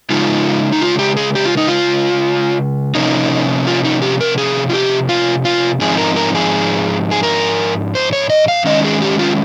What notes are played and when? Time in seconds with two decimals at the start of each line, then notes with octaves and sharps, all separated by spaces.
0.10 C#3 G#3 D#4 F4
0.72 D#4
0.82 F4
0.99 G4
1.17 G#4
1.35 G4
1.46 F4
1.57 D#4
1.68 F4
2.95 C3 F3 A#3 C#4 D#4
3.67 F4
3.85 D#4
4.02 G4
4.21 A#4
4.38 G#4
4.69 F4
4.73 G4
5.09 F4
5.45 F4
5.81 G#2 F3 C4 D#4 G#4
5.98 A#4
6.16 A#4
6.35 G#4
7.11 G#4
7.23 A#4
7.95 C5
8.13 C#5
8.30 D#5
8.48 F5
8.65 D#3 G#3 C#4 D#5
8.84 G#4
9.02 G4
9.19 F4